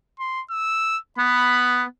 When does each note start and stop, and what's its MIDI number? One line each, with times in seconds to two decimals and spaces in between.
0.20 0.42 84
0.51 0.98 88
1.18 1.83 59
1.18 1.84 83